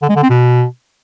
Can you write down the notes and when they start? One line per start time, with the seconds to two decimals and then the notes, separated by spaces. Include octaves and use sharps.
0.02 D3
0.09 G#3
0.16 D3
0.23 C4
0.30 B2